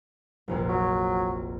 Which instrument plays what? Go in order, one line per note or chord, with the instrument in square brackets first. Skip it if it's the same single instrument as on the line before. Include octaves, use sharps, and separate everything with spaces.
[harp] F1 A#1 F2
[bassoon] F#3